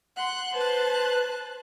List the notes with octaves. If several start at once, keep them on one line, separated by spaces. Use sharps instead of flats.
F#5 C6 F#6
B4 C5 A5 F#6